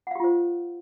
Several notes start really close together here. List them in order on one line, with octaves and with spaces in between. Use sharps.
F#5 F5 G4 F4 C5